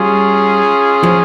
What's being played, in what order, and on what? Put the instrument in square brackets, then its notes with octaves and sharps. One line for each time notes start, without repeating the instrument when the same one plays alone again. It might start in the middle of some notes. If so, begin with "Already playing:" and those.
Already playing: [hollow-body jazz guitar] G3 [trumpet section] C#4 F4 G#4
[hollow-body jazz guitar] F3